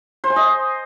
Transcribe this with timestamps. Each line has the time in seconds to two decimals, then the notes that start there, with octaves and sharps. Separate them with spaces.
0.24 C5
0.30 G#5
0.36 D#5